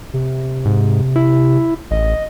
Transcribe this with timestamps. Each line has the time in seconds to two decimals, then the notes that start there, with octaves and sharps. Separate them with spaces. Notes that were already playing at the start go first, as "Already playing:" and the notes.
0.13 C3
0.65 G#2
1.16 E4
1.91 A1 D#5